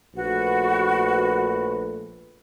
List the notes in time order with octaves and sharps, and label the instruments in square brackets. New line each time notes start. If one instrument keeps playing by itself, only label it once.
[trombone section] A#1 A3 B4 [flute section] F#4